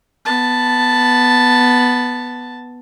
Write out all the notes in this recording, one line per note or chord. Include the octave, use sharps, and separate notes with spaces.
B3 A5